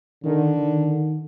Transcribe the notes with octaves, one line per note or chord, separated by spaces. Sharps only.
D3 D#3
D#3